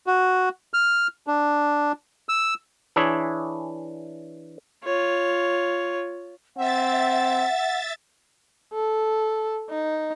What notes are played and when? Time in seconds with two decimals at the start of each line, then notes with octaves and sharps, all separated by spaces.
0.07 F#4
0.74 F6
1.27 D4
2.29 E6
2.96 E3 D4 E4 G#4 C#5
4.84 F4 C#5
6.57 C4 E5 F#5 A6
8.74 A4
9.70 D#4